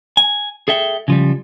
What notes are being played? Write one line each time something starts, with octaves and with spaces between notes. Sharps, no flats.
G#5
G#4 A4 E5 G5
C#3 F3 G3